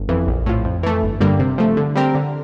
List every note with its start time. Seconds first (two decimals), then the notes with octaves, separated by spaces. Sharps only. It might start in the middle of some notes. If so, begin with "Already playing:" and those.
Already playing: G1
0.09 F2 E3
0.27 A#1
0.46 A2 F3
0.65 F2
0.83 E3 A3
1.03 G1
1.20 G2 D3 G3 A#3
1.39 C3
1.58 F3 A3
1.77 D3
1.96 G3 C4 G4 A#4
2.15 D3